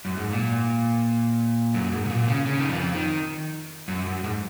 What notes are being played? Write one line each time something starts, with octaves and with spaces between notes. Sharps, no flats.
F#2
G#2
A#2
F#2
G#2
B2
A#2
C#3
C#3
D#3
F2 F3
D#3
F#2
F#2
G#2